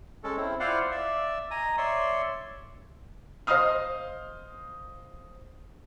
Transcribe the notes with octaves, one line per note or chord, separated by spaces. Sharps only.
G#3 C#4 A4
C4 E4
E4 F4 C5 D5 F5 F#5
D5 E5
D#5 G#5 A#5 D#6
C#5 D5 E5 C6
C5 D#5 F5 D#6 F6